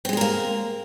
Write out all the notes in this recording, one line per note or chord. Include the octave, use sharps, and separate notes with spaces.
G#3 A#3 C4 G#4 A#4